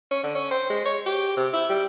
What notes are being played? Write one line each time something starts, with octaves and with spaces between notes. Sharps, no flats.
C#4
D3
C#4
C5
G#3
C#5
G4
C3
E4
G3